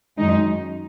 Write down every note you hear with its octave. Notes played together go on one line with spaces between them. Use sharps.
F#2 D#3 G#3 D#4